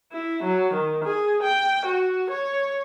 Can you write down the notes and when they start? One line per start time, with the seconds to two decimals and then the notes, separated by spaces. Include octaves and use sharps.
0.13 E4
0.43 F#3
0.74 D#3
1.05 G#4
1.43 G5
1.86 F#4
2.30 C#5